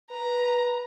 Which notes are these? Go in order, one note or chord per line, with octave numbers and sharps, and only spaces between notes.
B4 A#5